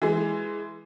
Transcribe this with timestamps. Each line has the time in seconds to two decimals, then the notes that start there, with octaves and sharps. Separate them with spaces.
0.02 E3 G#3